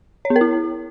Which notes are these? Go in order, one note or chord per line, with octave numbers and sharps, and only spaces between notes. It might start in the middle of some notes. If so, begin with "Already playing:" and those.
C#5
B3
A#4
E4